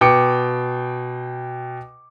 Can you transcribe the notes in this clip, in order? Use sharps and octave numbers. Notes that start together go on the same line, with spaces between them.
B2 G5 D6 C#7